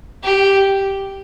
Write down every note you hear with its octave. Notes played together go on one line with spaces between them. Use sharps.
G4